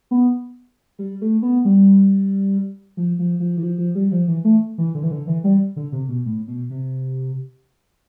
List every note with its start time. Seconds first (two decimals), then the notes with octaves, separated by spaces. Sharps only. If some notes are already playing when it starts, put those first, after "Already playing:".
0.11 B3
0.99 G3
1.21 A3
1.42 B3
1.65 G3
2.97 F3
3.19 F3
3.40 F3
3.57 E3
3.62 F3
3.78 F3
3.95 G3
4.11 F3
4.28 E3
4.44 A3
4.78 E3
4.95 D3
5.03 E3
5.11 D3
5.27 E3
5.44 G3
5.76 D3
5.92 C3
6.09 B2
6.26 A2
6.48 B2
6.70 C3